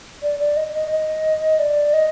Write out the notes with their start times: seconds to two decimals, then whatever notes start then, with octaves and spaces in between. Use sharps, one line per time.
0.23 D5
0.40 D5
0.57 D#5
0.74 D#5
0.91 D#5
1.59 D5
1.93 D#5